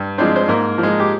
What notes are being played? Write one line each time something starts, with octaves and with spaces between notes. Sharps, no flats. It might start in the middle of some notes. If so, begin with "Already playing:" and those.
Already playing: G2
F3 G#3 C4 D4 C5
C5
G#2 A#3 A#4
F3
G#3
G4